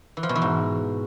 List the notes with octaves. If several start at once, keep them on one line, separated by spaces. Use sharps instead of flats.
E3
F3
B2
E3
G#2